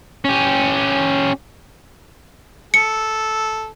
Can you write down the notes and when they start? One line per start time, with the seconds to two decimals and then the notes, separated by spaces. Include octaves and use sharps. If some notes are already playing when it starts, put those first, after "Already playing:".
0.25 C#4 G4
2.74 A4 C#7